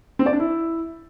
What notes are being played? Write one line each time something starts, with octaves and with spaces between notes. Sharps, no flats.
C4
D5
D4
E4